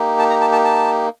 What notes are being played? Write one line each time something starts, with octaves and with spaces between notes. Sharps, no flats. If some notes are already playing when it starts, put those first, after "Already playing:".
Already playing: A#3 D#4 G4
A5
A#5
A5
A5
A5